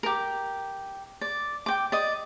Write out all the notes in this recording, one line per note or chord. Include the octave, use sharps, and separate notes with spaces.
G4 A#4
D5
G5 D6
D5 D#5